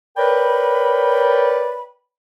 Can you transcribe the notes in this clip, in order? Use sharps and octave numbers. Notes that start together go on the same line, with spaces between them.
A#4 B4 C#5 D5 G5 B5